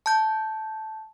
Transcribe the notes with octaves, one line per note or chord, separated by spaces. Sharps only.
A5 G6